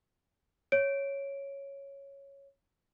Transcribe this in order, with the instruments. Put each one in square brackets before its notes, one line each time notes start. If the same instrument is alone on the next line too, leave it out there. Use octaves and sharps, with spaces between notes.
[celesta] C#5 D7